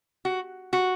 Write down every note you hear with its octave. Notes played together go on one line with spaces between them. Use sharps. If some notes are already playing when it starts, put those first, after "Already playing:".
F#4
F#4